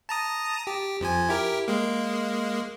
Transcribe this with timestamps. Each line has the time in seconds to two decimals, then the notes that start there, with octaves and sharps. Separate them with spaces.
0.09 A5 A#5 D#6
0.67 G4
1.00 F2 F3 G#5
1.29 E4 G4 A#4
1.68 G#3 A#3